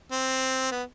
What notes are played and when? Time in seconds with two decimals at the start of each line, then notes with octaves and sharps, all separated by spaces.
0.12 C4
0.72 B3